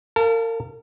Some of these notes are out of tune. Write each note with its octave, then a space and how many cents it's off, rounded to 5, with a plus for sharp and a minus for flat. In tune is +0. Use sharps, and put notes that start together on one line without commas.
A#4 -35 F5 +0 A5 +0